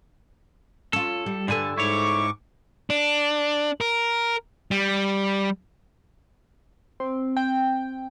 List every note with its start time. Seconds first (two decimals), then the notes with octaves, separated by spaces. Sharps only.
0.93 C#4 F4 A4
1.26 G3
1.48 G2 D3 A4 B4 D5 G#5
1.78 G#2 E4 C#5 C#6 D6
2.90 D4
3.81 A#4
4.71 G3
7.00 C4
7.37 G5